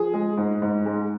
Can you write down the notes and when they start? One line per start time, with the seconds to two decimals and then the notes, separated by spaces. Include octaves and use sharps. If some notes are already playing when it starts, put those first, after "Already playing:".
Already playing: F3 G#4
0.14 G#3
0.37 G#2
0.62 G#2
0.86 G#3